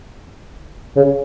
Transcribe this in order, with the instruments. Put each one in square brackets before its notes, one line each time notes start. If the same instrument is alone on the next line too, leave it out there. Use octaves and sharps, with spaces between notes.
[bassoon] C#3